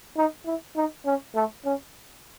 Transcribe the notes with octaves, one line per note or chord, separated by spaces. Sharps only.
D#4
E4
D#4
C#4
A3
C#4